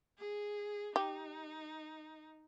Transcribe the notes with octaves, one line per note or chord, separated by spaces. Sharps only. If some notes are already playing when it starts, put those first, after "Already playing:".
G#4
D#4 G4